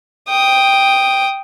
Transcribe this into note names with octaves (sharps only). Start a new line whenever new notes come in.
G5 D#6